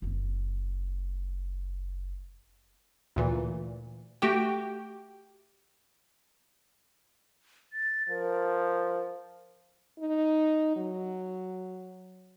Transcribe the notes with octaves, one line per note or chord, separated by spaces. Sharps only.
F#1 C4
D2 A#2 E3
A3 F#4 G4 G5
A6
F3 A#4
D#4
F#3